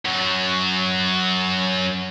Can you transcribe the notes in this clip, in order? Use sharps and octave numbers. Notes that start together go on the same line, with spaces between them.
F#2 F#3